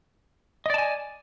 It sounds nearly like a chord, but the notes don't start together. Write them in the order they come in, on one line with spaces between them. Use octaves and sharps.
D#5 D5 A5 G#5